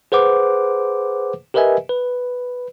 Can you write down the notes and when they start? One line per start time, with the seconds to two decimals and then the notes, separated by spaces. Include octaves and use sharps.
0.12 G#4 B4 C5 F#5 D6
1.54 G4 A#4 B4 D#5 E5 G#5
1.89 B4